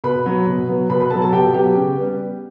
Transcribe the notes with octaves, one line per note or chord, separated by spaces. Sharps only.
B2 B4 B5
F#3 B3
B2
F#3 B3
B2 B4 B5
B4 B5
F#3 B3 A4 A5
A4 A5
B2 G4 G5
F#3 B3 G4 G5
C#3
G3 B3